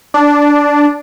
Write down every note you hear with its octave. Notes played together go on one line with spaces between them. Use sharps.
D4